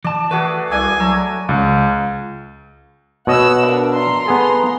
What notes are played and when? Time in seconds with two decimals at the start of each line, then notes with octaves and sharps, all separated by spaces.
0.04 E3 D5 A5
0.31 A3 F#4 G#4 B4
0.71 C2 G#4 D5 E5 G#5
1.00 F#3 A3 A#5 E6
1.49 C#2
3.27 B2 C#5 D#5 F#5 E6
3.65 D4 A#4
3.96 A#5 C6
4.26 B3 G#4 A4